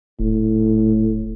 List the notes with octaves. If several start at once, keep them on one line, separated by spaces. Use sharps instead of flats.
D#1 A2